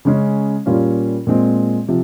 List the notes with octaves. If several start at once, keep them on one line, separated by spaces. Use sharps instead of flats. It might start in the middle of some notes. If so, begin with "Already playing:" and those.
C#3 G#3 C#4
A#2 G3 A#3 C#4 F4
A#2 G#3 C4
C3 F3